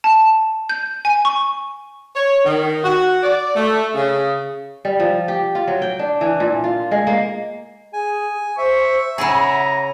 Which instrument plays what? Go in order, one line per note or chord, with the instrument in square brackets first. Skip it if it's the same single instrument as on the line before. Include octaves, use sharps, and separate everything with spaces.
[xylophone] A5
G6
G#5
C#6
[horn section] C#5
D#3
F#4
D5
A3
C#3
[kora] G3
F3
G4
F4
F#3
G5
D4
E3
A#2
F4
G#3
A#3
[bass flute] G#4 [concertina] G#5
[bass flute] C5 [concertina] E5 [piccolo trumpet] C#6
[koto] C#3 E4 G#4 [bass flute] F#5 [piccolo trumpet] A#5